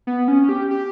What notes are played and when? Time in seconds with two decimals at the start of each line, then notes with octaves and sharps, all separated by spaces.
0.07 B3
0.28 C#4
0.49 G4
0.71 G4